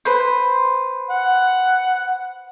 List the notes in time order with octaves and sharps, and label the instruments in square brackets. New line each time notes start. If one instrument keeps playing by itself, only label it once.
[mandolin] B4 C5
[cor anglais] F#5